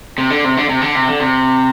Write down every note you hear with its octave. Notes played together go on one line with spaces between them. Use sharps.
C3
D3
C3
D3
C3
D3
C3
D3
C3